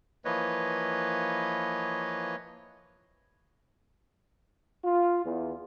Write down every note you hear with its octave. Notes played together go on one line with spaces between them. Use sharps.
E3 F3 A#3 B4 C#5 D#5
F4
E2